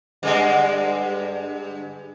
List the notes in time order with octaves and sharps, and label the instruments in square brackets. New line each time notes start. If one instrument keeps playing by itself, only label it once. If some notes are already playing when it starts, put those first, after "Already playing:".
[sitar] G2 D3 G#3